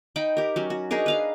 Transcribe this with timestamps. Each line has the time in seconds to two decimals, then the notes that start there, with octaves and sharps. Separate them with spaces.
0.16 D#4 G5 B5
0.37 G4 A#4
0.56 F#3 C#4
0.70 F#4
0.91 D4 D#4 G#4 A#4
1.06 B4 F5 A#5